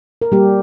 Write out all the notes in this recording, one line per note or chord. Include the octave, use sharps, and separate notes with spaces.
A#4
G3 A#3 G4